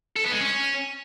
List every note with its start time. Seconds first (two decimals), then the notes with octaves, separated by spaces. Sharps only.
0.16 A4
0.25 B3
0.33 G#3
0.41 C#4